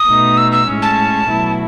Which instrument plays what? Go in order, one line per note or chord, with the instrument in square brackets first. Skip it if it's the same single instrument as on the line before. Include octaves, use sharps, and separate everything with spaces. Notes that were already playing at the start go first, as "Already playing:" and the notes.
Already playing: [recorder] D#6
[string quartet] B2 A3 D#4
[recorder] E6
E6
[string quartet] A2 G#3 C#4
[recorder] A5
[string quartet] B2 F#3 A3 E4